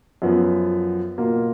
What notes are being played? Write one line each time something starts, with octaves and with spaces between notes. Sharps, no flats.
F#2 F3 B3
B2 A#3 F4